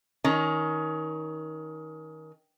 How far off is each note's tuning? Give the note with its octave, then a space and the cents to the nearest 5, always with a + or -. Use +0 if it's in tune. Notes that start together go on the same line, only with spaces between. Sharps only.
D#3 +20 C#4 +25